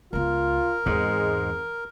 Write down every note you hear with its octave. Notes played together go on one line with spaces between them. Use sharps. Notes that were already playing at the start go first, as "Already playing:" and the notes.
C#2 B3 F4 A#4
E2 G#2 G#3 C4